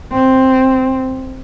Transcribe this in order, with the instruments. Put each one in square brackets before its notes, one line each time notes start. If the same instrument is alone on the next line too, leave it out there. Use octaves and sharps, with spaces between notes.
[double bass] C4